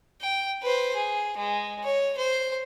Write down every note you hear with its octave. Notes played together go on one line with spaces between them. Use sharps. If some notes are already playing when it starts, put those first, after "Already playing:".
G5
B4 C5
G#4
G#3
C#5
C5